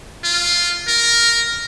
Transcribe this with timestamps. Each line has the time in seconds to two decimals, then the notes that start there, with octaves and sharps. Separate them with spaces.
0.24 F4
0.88 A#4